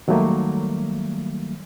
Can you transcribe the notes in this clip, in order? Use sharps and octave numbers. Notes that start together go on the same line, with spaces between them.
D#3 F#3 G3 A3 A#3